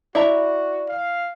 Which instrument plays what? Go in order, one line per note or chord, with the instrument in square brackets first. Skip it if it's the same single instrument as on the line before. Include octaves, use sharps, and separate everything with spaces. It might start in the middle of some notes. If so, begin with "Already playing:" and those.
[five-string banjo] E4 E5 A#5 [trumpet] F#4 [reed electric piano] D5
[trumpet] F5